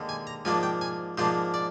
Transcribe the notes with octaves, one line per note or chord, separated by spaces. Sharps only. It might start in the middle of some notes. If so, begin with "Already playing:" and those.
Already playing: D#2 D3 G#3
G#5
A#5
G#2 F3 A#3 D4 G#5
G5
G#5
G#2 F3 A#3 D4 C5
D5